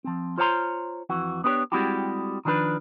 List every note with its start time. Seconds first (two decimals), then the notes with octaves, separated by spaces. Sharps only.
0.04 F3 C4
0.38 F4 C5 C#5 F5 A#5 C6
1.09 F2 E3 F#4
1.44 B3 D4 G4 B4 C#5
1.72 G3 G#3 C4 E4 F#4 G4
2.45 D#3 F3 D4 G#4 B4